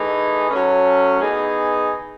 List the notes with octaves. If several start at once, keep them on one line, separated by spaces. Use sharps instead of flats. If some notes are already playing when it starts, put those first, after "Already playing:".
Already playing: E3 A3 D#4 G#4
F#3 A3 C#4
E3 B3 D#4 G#4